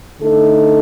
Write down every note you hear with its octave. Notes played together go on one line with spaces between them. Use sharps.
D3 A3 D#4 A4